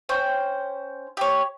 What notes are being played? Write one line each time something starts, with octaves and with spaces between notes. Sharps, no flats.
C#4 C5 G5
G4 C#5